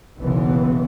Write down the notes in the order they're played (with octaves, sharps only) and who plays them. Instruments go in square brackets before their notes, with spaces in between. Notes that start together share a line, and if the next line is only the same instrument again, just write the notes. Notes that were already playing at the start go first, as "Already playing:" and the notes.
[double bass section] F#1 B1 E3 B3